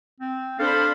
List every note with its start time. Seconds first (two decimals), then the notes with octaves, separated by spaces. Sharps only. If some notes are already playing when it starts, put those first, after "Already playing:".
0.20 C4
0.59 D4 A4 C5 F5 B5